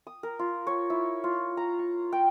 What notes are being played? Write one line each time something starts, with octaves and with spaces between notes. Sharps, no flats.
D#6
A#4
F4
C#5
E4
F4
A#5
C#6
G5